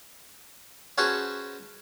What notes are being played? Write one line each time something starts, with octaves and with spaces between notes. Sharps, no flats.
C#4 F#4 G#4 B4 C5 A5